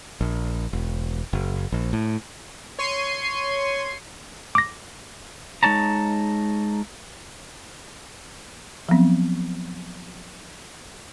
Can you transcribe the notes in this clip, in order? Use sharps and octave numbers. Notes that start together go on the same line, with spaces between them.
A#1
E1
F#1
A#1
A2
C#5 C6 C#6 C7 D#7
D6 A#6
G#3 D#4 C#5 A5 A#5
F3 F#3 B3 C4